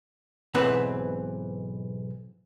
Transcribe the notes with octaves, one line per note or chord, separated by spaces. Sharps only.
B1 G#2 E3 C4 B4 F#5